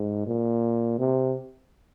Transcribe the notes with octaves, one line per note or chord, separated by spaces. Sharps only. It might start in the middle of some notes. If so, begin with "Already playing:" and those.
Already playing: G#2
A#2
C3